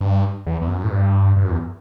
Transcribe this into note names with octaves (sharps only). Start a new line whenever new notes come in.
G2
E2
E2
F#2
A2
G2
G2
F#2
E2